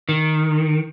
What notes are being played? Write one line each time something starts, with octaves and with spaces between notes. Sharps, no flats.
D#3